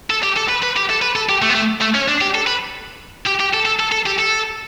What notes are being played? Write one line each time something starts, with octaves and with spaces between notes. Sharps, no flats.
A4
G4
A4
B4
B4
G4
A4
B4
A4
G4
A3
B3
A3
A3
C#4
D4
G4
A4
B4
G4
G4
A4
A4
A4
A4
G4
A4